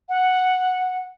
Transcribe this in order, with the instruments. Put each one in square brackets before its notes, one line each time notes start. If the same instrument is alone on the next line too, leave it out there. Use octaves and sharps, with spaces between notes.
[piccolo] F#5